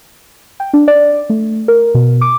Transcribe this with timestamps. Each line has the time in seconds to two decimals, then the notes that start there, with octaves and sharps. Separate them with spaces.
0.60 G5
0.73 D4
0.88 D5
1.30 A3
1.68 A#4
1.94 B2
2.21 D6